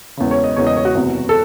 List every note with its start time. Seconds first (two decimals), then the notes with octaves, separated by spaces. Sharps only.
0.17 E1 E2 C#3
0.31 C#5
0.44 D#5
0.56 E1 E2 C#3 C#5
0.67 D#5
0.76 C#5
0.85 F#4
0.95 F#1 E2 C3
1.29 A4